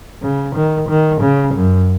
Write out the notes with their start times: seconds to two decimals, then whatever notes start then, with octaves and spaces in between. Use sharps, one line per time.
0.22 C#3
0.55 D#3
0.89 D#3
1.21 C#3
1.54 F#2